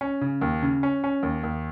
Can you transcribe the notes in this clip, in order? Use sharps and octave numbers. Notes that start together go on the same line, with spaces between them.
C#4
C#3
D#2
C#3
C#4
C#4
D#2
D#2